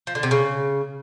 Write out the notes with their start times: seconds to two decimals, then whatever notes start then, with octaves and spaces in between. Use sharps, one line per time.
0.07 F3
0.15 D3
0.23 C3
0.31 C#3